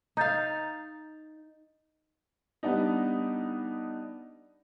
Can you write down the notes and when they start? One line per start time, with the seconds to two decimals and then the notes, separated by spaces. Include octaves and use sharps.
0.17 D#4 F5 A#5 G6 A6
2.63 G3 B3 D4 D#4